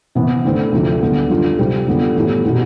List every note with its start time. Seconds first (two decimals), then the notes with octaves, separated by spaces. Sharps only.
0.15 C3 E3 B3
0.44 D3 A3 C4 E4
0.72 D2 C3 F3
1.02 D3 G3 B3
1.30 D3 G3 D4 F4
1.59 C3 G3 C4 G4
1.87 D3 G3 B3 F4
2.15 A2 E3 B3 E4 G4
2.44 B2 B3 E4 G4